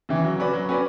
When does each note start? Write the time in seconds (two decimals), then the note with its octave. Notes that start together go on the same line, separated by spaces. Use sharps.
0.09 C#3 E3
0.24 F#3
0.38 C#4 F#4 B4 D5
0.53 F#3
0.69 C#4 F#4 B4 D5